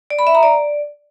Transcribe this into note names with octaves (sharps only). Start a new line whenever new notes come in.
D5
B5
E5
A#5
D5